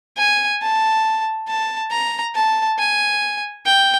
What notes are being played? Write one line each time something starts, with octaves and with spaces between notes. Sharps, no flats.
G#5
A5
A5
A#5
A5
G#5
G5